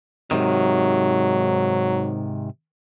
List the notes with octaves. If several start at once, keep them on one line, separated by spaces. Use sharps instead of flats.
G#2 C3 D#3 F#3